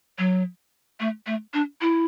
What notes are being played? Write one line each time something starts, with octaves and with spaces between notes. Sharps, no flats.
F#3
A3
A3
D4
E4